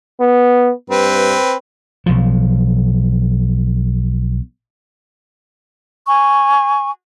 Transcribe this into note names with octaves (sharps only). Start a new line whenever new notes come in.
B3
G2 C4 B4
B1 F3
G#5 C#6